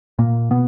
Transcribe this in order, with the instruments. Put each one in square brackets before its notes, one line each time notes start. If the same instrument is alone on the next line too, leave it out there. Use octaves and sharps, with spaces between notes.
[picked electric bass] A#2 A#3
B2 B3